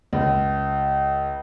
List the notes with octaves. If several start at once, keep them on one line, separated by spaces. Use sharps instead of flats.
C#2